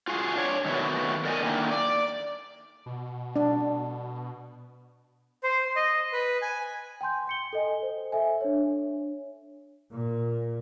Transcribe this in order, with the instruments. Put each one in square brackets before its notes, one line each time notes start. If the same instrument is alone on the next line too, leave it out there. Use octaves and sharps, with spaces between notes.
[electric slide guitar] F4 F#4 G#4 F5
D4 C#5
D#3 F#3 A3 B3 F#4
A#4 D5 D#5 F#5 G#5
D3 D#3 A#3 E4
D5
[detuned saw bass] B2
[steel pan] D4
[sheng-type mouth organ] C5
D#5
B4
G#5
[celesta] G5 G#5 C6 G6
G5 C#7 G7
A4 D#5 G#5
C5
A4 E5 G#5
D4 C#5
[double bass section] A#2